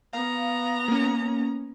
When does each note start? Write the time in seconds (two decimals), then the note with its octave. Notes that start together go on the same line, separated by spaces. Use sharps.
0.13 B3 F5 A#5
0.88 A#3 C#4